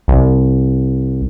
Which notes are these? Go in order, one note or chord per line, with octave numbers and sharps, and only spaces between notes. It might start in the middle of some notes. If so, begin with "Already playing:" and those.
C2